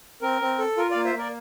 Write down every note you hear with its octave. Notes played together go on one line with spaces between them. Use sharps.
C4 A#4
C4
A4
F4 A#4
A#3 D5 F5
C5 E5
A#3 A#4 D5